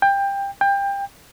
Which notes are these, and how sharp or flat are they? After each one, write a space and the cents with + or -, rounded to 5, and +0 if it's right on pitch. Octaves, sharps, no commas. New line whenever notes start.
G5 +20
G5 +25